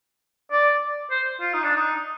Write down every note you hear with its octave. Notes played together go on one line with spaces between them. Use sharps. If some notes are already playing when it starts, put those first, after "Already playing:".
D5
C5
F4
D#4
D4
D#4